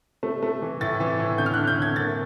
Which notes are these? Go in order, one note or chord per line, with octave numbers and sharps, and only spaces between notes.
A3
A3
E3
A2 A6
E3
A2
D3 G6
F6
D3 F#6
G6
D3 G#6
A#3 A6